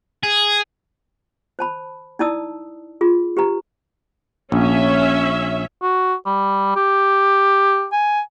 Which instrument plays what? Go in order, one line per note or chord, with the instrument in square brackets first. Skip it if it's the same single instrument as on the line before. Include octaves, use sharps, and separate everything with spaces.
[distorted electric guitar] G#4
[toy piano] C5 A5 B5
D#4 E4 D5 A5 D#6 E6
F4 G#4
G4 B4 A#5
[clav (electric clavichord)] A#1 [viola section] C#4 E5
[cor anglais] F#4
G3
G4
G#5